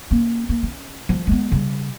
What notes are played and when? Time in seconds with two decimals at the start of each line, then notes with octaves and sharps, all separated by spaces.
0.11 A#3 C#4
0.49 A#3
0.63 C#4
1.09 F3 G3
1.27 G#3 B3
1.52 C#3 G3